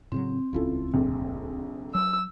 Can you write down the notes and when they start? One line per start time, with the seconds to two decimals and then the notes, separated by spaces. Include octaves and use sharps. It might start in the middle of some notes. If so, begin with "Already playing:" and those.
0.12 A2 C#3 F#3 C4
0.53 D#1 C#2 C#4 E4 F4 A4
0.93 F1 A#1 F2
1.95 F#3 E6